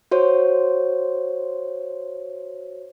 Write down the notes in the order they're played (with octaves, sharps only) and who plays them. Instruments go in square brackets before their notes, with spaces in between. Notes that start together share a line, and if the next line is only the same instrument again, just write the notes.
[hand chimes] F#4 C5 C#5